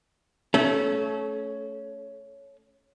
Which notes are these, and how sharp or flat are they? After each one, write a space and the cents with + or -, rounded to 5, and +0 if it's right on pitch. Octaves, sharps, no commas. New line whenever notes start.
A3 +0 C#4 +5 A4 -30